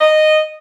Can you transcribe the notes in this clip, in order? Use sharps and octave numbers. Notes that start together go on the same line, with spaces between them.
D#5